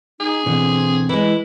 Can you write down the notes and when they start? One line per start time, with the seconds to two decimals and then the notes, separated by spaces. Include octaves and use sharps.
0.20 D#4 G#4
0.46 B2 D3 E3 C4
1.09 E3 G#3 E4